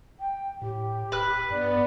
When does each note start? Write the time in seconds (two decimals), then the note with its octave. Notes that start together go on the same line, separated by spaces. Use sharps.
0.20 G5
0.62 A2 G4
1.12 D1 B4 F#6
1.50 G2 B3 D5